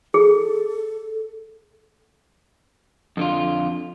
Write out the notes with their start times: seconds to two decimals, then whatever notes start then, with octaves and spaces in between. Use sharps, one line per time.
0.14 G#4 A4
3.17 F2 D3 F4